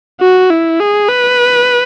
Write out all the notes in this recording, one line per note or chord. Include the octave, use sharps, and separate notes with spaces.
F#4
E4
G#4
B4